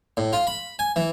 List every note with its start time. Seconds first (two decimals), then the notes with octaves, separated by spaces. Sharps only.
0.17 A2
0.33 F4
0.47 B5
0.79 G#5
0.96 E3